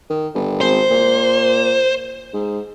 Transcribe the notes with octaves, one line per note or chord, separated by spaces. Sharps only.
D#3
G1
G#1 C5
A#2
G#2